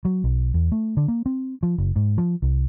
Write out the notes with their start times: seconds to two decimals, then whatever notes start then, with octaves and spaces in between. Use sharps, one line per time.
0.05 F#3
0.24 B1
0.54 E2
0.72 A3
0.97 D3
1.08 A#3
1.26 C4
1.63 F3
1.78 F#1
1.96 G#2
2.18 F3
2.42 C2